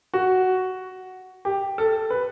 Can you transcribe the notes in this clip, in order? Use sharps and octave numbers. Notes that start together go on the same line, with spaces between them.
F#4
G4
A4
B4